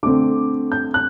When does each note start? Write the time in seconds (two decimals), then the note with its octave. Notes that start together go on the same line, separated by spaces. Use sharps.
0.03 D3 A3 C4 D6
0.72 G6
0.94 F#6